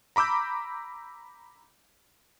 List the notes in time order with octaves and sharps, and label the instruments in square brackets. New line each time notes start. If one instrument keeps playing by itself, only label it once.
[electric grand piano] A#5 B5 D6 E6 G6